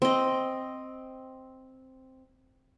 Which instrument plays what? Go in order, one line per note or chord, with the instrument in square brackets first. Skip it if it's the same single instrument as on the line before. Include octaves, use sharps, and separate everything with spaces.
[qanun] C4 D#5